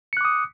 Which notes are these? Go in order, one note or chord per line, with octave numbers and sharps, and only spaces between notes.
D6 D#6 F#6 C#7